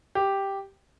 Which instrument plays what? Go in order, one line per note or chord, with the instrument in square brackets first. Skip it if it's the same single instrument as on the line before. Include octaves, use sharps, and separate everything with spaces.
[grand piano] G4